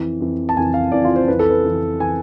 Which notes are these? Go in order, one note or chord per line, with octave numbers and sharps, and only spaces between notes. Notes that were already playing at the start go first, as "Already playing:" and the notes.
Already playing: F2 E3
F2 E3
A5
F2 E3 G#5
F5
F2 E3 D5
F4
C5
F2 E3 B4
A4
B4
F2 E3
E3 G#5